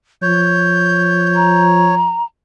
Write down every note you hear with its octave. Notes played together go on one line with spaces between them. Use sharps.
F3 C#5 G6
A#5